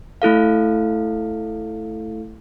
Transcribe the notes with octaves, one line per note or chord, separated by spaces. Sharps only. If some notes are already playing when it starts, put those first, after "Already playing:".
A3 E4 A4 F5